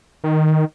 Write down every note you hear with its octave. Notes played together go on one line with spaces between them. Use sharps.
D#3